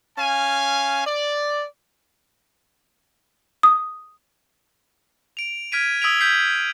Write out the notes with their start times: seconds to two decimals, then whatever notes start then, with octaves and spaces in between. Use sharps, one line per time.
0.17 C#4 F5 G#5
1.06 D5
3.63 D#6
5.37 D7 F7
5.72 F6 G#6 B6 D7 D#7
6.01 D#6 E6 G#6 B6 D7 F7
6.20 G6 B6 C7